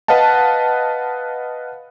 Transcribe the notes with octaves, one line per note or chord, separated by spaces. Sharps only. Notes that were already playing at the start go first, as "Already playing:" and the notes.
B4 D#5 F5 F#5 A5